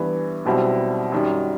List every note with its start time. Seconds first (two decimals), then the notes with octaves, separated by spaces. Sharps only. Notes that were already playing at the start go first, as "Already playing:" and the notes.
Already playing: G2 E3 B3
0.45 B1 B2 G3 C4 E4
1.12 F#2 D#3 G3